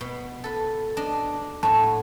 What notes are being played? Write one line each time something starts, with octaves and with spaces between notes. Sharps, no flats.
B2
A4 B4
D4 D#5
A2 F#4 A5